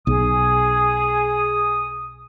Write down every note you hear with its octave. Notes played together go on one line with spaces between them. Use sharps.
B1 G#4 D#6